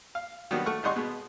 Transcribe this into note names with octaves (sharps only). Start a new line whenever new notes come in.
F5
D#3 F#3 G3 B3 D4
A3 F#5 C#6 F6
G#1 G3 D#4 F#5 C6 C#6
B2 G#3 B3